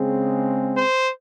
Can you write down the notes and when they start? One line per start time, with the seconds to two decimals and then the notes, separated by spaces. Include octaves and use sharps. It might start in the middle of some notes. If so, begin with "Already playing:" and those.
Already playing: C#3 G#3 C4
0.75 C5